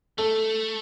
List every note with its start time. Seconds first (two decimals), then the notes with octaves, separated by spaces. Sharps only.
0.18 A3 A4